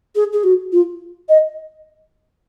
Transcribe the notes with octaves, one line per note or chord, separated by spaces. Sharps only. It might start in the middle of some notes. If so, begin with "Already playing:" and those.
G#4
G#4
F#4
F4
D#5